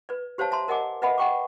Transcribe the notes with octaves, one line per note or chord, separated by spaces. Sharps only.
B4 D5
G4 C5 C#5 F5 A5
E5 A5 A#5 C6
A#4 D#5 F#5 G#5 D6
B4 D#5 E5 F#5 G#5 B5
D#5 F#5 G5 C#6 D6